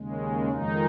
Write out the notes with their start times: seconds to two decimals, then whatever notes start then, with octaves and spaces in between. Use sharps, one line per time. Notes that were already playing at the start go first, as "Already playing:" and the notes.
Already playing: D#2 C#3 G#3
0.50 F2 D#3 G#3 D#4